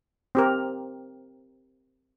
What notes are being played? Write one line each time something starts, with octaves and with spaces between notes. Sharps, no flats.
C4 G4 A#4